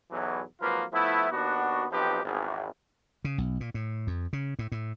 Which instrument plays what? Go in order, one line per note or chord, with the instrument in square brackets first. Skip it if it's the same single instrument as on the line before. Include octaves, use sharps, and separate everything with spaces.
[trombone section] B1 E2 E3 F#3
G#1 F3 F#3 A#3 F4 B4
F3 A3 B3 E4
D#2 B3 D4 F#4
B1 F3 C4 D#4 G4 B4
G#1 E2
[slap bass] C#3
B1
A#2
A2
F2
C#3
A2
A2